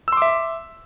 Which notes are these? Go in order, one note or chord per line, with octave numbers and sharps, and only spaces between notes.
E5 C6 D6 E6